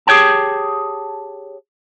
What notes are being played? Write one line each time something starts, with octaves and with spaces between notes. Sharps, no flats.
G4 G#4 C5 C#5 G5 A5